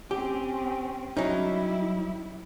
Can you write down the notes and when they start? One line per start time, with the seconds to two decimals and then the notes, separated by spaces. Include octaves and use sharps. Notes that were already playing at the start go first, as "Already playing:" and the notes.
0.11 C4 C#4 G4
1.17 F#3 G3 C#4 D#4 E4